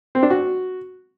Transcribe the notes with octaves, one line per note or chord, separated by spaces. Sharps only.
C4
D4
F#4